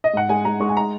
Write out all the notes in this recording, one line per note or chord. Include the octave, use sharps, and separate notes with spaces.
D#5
G#2 F#5
G#3 G#5
G#3 A#5
G#3 C#6
G#5
A#5